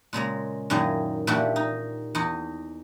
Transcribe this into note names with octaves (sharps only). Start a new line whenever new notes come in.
A#2 C#3 G#3 A#5
F#2 A#2 D#3 E3 G#4 A#5
A#2 E3 D4 E4 F#4 G4
D#4
E2 D#4 D#5